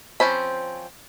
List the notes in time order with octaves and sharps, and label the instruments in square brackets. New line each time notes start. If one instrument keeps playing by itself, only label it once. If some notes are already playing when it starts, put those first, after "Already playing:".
[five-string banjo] F3 C4 C#4 C5 B5